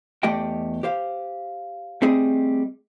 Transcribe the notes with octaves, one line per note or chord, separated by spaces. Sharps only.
E2 A3 G4 D5 D#5 G5
G4 C5 F5
G3 A3 C4 G#4 D#5